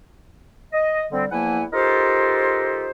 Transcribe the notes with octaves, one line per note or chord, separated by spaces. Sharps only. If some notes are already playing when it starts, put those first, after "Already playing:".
D#5
D3 G3 C4
E2 F3 A#3 E4 F#5 G#5
D#4 F4 G4 A4 A#4 C5